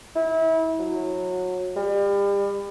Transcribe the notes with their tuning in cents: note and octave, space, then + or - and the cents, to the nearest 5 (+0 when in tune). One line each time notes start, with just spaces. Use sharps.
E4 -30
F#3 -20
G3 +35